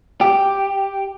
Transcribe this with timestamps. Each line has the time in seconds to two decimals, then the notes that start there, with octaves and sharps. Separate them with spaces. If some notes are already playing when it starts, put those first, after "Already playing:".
0.21 G4